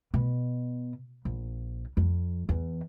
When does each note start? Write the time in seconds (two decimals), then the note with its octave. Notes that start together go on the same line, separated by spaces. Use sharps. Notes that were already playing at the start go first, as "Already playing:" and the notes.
0.14 B2
1.25 A#1
1.97 F2
2.49 E2